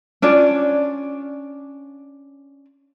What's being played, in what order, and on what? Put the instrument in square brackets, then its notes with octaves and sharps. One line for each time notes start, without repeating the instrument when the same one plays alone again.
[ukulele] C#4 D4 F4 D5